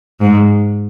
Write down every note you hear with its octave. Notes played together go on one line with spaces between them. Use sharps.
G#2